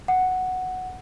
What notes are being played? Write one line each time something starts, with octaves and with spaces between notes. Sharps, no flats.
F#5